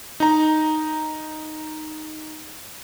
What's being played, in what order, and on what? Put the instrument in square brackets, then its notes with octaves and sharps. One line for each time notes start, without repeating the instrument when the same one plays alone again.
[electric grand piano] D#4 A#5